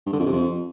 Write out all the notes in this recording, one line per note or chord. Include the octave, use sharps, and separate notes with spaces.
G2
D3
F2
C3
F2